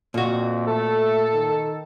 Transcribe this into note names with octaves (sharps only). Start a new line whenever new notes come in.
F2 A#2 F#4
A3 A4
D#3